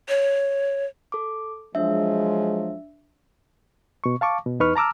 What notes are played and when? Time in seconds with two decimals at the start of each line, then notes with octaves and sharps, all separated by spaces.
0.09 C#5
1.12 A4 D6
1.75 F3 F#3 G#3 D4 E5
4.04 B2 C#6
4.21 F5 A5 C#6 D6
4.46 B2
4.60 E2 D#4 B4 C#6 F6
4.76 A5 A#5 D6 E6 F6